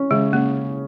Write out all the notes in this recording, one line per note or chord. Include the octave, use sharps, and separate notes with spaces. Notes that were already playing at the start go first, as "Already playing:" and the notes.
Already playing: C#4
C#3 G#3
C#3 A#3